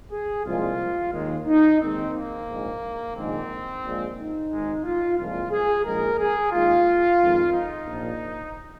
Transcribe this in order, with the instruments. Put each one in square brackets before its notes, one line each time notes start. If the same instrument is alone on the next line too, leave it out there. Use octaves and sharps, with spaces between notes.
[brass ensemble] G#4
C2 A#2 F3 G#3 F4
D#2 D#3 G#3
D#4
D#2 D#3 G#3 C4
A#3
A#1 G#2 G#3
A#1 G#2 D#3 G#3 C4
A#1 A#2 G#3
D#4
G#1 G#2 G#3
F4
C2 A#2 F3 G#3 F4
G#4
A#1 G#2 F3 G#3 A#4
G#4
D#2 D#3 G#3 F4
F2 D#3 G#3
D#4
A#1 A#2 F3